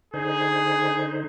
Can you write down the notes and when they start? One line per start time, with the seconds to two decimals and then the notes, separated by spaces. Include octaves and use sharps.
0.14 D3 D#4 G#4 C5